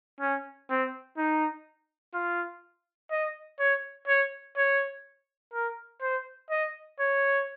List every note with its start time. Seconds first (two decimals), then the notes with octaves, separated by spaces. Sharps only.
0.20 C#4
0.70 C4
1.17 D#4
2.14 F4
3.11 D#5
3.59 C#5
4.08 C#5
4.57 C#5
5.53 A#4
6.01 C5
6.50 D#5
6.99 C#5